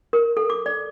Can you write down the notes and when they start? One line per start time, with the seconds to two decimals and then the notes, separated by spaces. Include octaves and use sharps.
0.13 A#4
0.37 A4
0.50 D6
0.66 D5